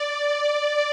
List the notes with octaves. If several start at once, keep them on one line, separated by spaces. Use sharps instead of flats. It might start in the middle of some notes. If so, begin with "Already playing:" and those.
Already playing: D5